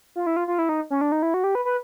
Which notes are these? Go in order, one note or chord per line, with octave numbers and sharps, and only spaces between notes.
F4
E4
F4
F4
E4
D#4
C#4
D4
D#4
E4
F#4
G4
B4
B4